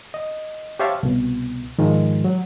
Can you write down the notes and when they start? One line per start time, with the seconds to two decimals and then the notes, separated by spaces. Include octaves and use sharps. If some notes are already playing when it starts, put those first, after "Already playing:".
0.14 D#5
0.79 G4 C5 C#5 E5 F5 A5
1.03 C2 B2
1.78 G#2 D#3 F3 G#3
2.24 F#3